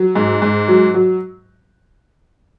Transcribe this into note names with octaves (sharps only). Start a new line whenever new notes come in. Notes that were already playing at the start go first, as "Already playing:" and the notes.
Already playing: F#3
G#2
G#2
F#3
F#3